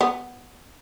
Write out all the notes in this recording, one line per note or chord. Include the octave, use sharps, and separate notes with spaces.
B3